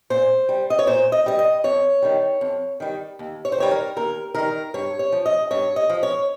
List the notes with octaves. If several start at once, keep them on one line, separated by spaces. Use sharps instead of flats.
A#2 C5
G3
D#5
C#5
A#2 C5
D#5
G3 D#5
D#5
F2 C#5
D#3 G3
F2
D#3 G3
D#2
C#5
C5
D#3 G3 C#5
A#4
D#2 A#4
D#3 G3 A#4
G2 C#5
C#5
F3
D#5
G2 C#5
D#5
F3
C#5